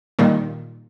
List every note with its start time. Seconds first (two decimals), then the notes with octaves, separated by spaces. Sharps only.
0.19 A#2 D#3 G3